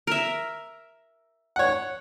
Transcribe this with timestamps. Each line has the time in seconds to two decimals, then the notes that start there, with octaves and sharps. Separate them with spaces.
0.07 A#4 E5
1.56 C#5 F#5